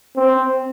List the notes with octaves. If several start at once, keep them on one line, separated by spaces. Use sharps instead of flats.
C4